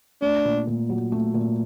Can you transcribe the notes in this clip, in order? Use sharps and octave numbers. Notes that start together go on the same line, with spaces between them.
A3 D4
A#2
A#2
F#3
A3
A#2